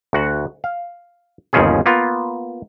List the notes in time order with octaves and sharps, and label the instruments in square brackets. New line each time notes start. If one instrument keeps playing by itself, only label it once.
[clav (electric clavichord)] D2 F#4 F#5
F5
G1 D#2 C#3 F3 C#4 G#4
A#3 B3 F4